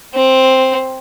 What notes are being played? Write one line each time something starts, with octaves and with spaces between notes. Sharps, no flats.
C4